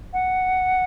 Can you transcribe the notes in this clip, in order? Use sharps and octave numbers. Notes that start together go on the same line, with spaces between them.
F#5